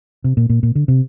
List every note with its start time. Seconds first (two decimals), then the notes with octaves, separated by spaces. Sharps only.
0.24 C3
0.37 A#2
0.50 A#2
0.63 A#2
0.75 D3
0.88 C3